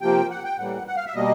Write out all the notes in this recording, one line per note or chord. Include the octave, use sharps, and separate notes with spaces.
C3 F3 A#3 G5
F#5
G5
A2 E3 G3 A#3 F#5
F#5
F5
E5
B2 G3 A#3 D#5